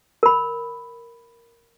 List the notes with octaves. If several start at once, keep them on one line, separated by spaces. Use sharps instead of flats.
A#4 B5